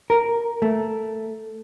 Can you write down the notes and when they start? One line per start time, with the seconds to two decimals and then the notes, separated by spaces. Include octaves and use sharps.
0.10 A#4
0.62 A3